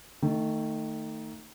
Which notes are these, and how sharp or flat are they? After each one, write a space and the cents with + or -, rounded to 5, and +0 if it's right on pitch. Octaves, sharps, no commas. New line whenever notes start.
D#3 +0 A3 +30